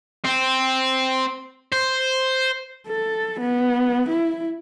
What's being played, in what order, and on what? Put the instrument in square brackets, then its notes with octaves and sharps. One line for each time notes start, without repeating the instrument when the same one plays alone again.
[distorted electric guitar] C4
C5
[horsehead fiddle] A4
B3
E4